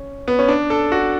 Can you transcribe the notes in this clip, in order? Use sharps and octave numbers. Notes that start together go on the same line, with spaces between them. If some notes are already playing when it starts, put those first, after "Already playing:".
Already playing: C#4
B3
C#4
D4
A4
F#4